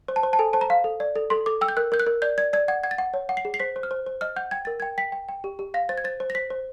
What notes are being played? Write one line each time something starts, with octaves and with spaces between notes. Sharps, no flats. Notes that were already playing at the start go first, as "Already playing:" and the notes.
C5
A5
C5
A5
A4 G#5
C5 A5
A#5
F5
A4
D5
A4
A4 C6
A4 D6
G5 E6
G6
A#4 F#6
A#4 G6
F#6
A#4
D5 G6
D5 G#6
D5 G#6
F#5 G#6
F#5 G#6
A6
F#5
C#5
F#5
C7
G#4
C7
C5 B6
C5
F6
C5
C5
D#5 F6
F#5 G6
G5 G#6
A#4 A6
G#6
G5
G5 B6
G5
G5
G4
G4
F5 A#6
C5 A6
G#6
C5 A6
C5
A#6
C5 B6
C5